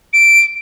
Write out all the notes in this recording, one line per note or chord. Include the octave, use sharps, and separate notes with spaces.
D7